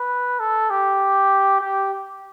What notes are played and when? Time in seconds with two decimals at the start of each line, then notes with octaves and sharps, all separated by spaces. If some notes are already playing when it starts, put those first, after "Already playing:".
Already playing: B4
0.40 A4
0.71 G4
1.61 G4